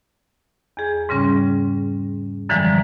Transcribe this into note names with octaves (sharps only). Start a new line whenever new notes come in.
E2 G#4
G#2 C#3 G3 C#4
F#2 D3 E3 F3 G3 G#3